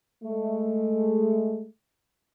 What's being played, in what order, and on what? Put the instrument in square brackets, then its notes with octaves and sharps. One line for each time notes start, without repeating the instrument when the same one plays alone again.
[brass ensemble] G#3 A3